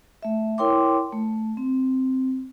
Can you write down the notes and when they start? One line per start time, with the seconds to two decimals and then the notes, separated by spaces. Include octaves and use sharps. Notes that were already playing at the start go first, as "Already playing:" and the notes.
0.23 A3 E5
0.58 E4 A#4 C#5 G5 C6 D6
1.12 A3
1.57 C4